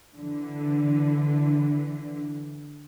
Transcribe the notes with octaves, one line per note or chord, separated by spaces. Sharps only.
D3 E3